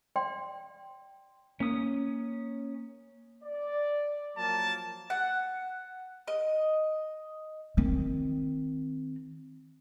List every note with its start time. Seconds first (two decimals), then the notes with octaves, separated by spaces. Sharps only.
0.16 D5 G5 C6
1.60 A#3 C#4 D#6
3.43 D5
4.37 F3 F#3 A#3 A5
5.10 F#5
6.28 D#5
7.77 D#3 C4